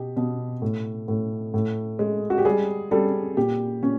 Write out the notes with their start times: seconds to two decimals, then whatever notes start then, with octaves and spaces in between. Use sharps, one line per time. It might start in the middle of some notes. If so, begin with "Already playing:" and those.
Already playing: B2 G4
0.17 B2
0.62 A2
1.08 A2
1.54 A2
1.99 G#3
2.30 F#4
2.38 G4
2.45 G3 G#4
2.91 G3 A4
3.37 A#2 G4
3.83 A#2 C#4